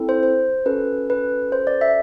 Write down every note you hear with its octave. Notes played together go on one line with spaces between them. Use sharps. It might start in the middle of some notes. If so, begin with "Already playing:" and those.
Already playing: C4 E4 A4
C5
C5
C#4 F#4 A4 B4
B4
C5
D5
E5